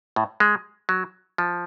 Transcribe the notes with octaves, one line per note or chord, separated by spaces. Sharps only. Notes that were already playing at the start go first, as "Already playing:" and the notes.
A2
G#3
F#3
F3